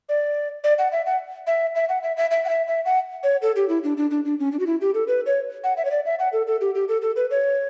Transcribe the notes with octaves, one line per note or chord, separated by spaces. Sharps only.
D5
D5
F#5
E5
F#5
E5
E5
F#5
E5
E5
E5
F#5
E5
E5
F#5
C#5
A4
G4
E4
D4
D4
D4
D4
C#4
D4
F#4
E4
G4
A4
B4
C#5
F#5
E5
C#5
D5
E5
F#5
A4
A4
G4
G4
A4
A4
B4
C#5